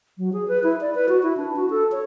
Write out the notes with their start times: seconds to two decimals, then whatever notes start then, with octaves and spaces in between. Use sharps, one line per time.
0.18 F#3
0.33 G#4
0.48 B4
0.63 E4
0.81 D5
0.95 B4
1.09 F#4
1.23 E4
1.37 D4
1.56 F#4
1.70 A4
1.92 C#5